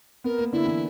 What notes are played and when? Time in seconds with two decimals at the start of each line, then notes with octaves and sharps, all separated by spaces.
0.24 B3 A#4
0.39 A#3
0.53 D3 E4
0.65 E3